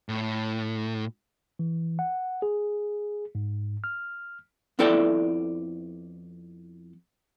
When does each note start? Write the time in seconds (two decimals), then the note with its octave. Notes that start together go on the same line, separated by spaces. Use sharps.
0.09 A2
1.59 E3
1.99 F#5
2.42 G#4
3.35 G#2
3.84 F6
4.79 F2 B3 E4 A4 D5 G5